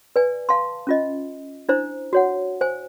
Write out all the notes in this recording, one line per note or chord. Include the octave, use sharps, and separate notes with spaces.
B4 D5 G#5
F5 A5 C6
C#4 F4 D#5
D4 E4 C5 A#5
F#4 C#5 F#5
C5 G#5